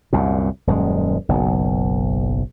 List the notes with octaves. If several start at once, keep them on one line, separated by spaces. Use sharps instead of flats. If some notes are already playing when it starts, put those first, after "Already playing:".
C2 F#2 A#2
D#1 F#2 G#3
F#1 B1